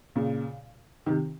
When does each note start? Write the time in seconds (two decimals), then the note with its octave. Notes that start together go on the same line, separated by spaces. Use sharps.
0.16 A#2 C#3
1.06 C3 D#3